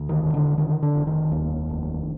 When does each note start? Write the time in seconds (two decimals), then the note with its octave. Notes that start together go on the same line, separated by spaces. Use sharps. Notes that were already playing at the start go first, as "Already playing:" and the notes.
Already playing: D2
0.09 D#3
0.21 E1
0.34 D3
0.58 D3 D#3
0.83 D3
0.95 F1
1.07 D#3
1.32 D#2
1.69 F1